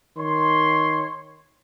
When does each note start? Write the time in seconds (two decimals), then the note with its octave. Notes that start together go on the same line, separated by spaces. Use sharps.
0.18 D#3 C#5 C6